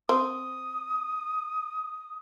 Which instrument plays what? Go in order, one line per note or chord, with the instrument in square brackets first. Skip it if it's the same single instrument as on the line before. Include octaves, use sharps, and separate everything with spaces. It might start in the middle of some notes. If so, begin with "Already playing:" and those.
[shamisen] C4 [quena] D#6